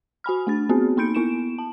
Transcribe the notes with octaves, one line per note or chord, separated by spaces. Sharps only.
F#4 G#5 B5 F6
A3 D4 A6
B3 C4 F#4 G#4
A#3 D#4 B5 G6 C#7 D7
B3 E4 D7 E7
A5